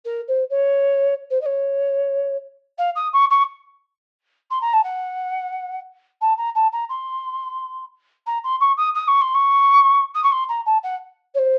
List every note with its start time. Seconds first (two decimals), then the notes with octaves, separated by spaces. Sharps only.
0.05 A#4
0.28 C5
0.50 C#5
1.30 C5
1.41 D#5
1.46 C#5
2.78 F5
2.95 D#6
3.13 C#6
3.30 C#6
4.50 C6
4.61 A#5
4.73 A5
4.83 F#5
6.21 A5
6.37 A#5
6.55 A5
6.72 A#5
6.89 C6
8.26 A#5
8.44 C6
8.60 C#6
8.77 D#6
8.94 D#6
9.07 C#6
9.21 C6
9.34 C#6
10.14 D#6
10.23 C#6
10.32 C6
10.49 A#5
10.66 A5
10.83 F#5
11.34 C#5
11.38 C5